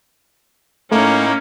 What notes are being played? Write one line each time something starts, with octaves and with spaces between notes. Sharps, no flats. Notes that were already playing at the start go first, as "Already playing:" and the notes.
A2 A3 A#3 C#4 D#4